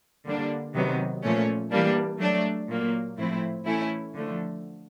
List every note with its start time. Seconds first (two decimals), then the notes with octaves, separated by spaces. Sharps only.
0.26 D3 G3 A#3 D4
0.75 C3 D#3 F#3 B3
1.23 A#2 F3 A3 C#4
1.71 E3 G3 A#3 D4
2.20 F#3 A3 D4
2.68 A#2 F#3 A#3
3.17 A2 F3 A3 C4 E4
3.65 E3 A3 C#4 E4
4.14 D3 F3 A3